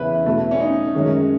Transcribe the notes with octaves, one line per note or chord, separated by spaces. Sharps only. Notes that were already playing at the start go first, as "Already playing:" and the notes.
Already playing: E2 C#3 E3 E4 B4
B2 A3 E4
C#4
D#4
F#2 D#3 G#3 C#4